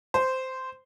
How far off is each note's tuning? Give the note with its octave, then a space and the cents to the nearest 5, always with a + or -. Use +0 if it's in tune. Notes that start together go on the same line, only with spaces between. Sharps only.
C5 -10